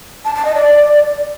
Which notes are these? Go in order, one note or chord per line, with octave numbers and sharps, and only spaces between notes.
A5
A5
D#5
D5